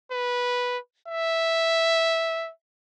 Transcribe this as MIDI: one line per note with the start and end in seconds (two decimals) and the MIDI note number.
0.12 0.78 71
1.08 2.51 76